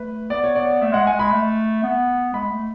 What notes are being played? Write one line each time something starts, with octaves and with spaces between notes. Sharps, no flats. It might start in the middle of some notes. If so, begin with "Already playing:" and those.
Already playing: A3 B4
B3 D5
C#5
D5
A3 E5
G#3 F#5
G#5
G#3
B5
A3
B3
G#3 B5
A3